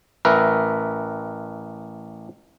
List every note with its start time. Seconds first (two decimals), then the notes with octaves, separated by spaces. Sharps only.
0.25 A1 A#4 B4 E5